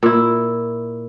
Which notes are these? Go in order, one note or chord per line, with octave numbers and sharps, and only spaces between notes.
A#2 E4